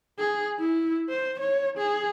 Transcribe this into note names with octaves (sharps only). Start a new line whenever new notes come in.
G#4
E4
C5
C#5
G#4